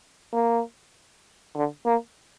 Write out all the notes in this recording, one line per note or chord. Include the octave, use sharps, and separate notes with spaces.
A#3
D3
A#3